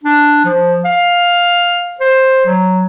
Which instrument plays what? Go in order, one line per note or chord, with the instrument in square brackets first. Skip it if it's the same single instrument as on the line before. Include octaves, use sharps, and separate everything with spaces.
[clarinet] D4
F3
F5
C5
F#3